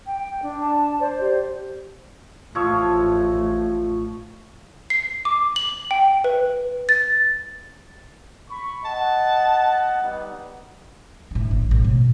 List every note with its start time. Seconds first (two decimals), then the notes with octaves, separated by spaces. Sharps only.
0.06 G5
0.42 D4
0.61 A5
0.99 C5 D5
1.20 G4
2.55 A1 A2 F3 C#5 E6
4.90 C7
5.25 D6
5.56 F#7
5.91 G5
6.24 B4
6.89 A6
8.49 B5 C#6
8.85 D#5 F#5 A5
10.02 G3 B3 D#4
11.31 A2 D3
11.51 A1
11.71 A2
11.84 B2